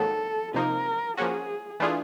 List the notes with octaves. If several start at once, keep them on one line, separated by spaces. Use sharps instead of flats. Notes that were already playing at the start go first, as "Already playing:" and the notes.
Already playing: G#2 D#3 F#3 A#3 A4
C3 F3 A#3 D#4 A#4
F3 A#3 C#4 F#4 G#4
E3 A3 D4 F4 G#4